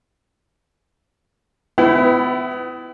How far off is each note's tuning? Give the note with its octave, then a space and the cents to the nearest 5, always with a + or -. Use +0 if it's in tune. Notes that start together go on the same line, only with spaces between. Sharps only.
B3 +30 E4 +0 G5 -40